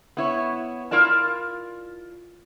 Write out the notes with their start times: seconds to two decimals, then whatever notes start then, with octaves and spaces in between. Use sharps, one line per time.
0.17 B3 E4 C#5
0.91 E4 F4 A#4 D5 A5